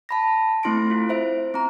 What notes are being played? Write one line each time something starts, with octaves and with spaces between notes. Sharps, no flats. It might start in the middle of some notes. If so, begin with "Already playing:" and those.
A5 B5 A#6
A3 C4 E4 C6 A#6 D7
E4 F4
C5 E5 D7
C4 A#5